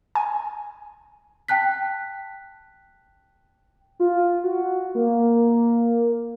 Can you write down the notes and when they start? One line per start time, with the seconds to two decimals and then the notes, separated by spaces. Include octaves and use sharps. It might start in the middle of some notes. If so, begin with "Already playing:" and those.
0.15 G#5
1.48 G5 A5 F#6 B6
4.00 F4
4.44 F#4
4.95 A#3
5.34 A#3